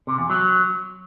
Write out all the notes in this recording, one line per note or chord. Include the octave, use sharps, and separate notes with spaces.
C3
E2
F#3